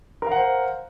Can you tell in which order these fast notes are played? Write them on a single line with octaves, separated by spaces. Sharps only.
A#4 F5 F#5 C5